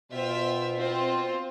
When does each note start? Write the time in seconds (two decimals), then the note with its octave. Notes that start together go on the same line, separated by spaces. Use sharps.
0.12 B2 F4 C5 E5 G5
0.76 C4 F4 C5